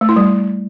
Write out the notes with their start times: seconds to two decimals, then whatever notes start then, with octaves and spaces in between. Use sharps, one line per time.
0.01 A3
0.09 E4
0.16 G3